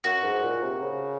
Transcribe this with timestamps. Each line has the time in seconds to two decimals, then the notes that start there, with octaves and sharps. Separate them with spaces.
0.04 F#2 F#4
0.24 G#2
0.43 A#2
0.63 C3
0.82 C#3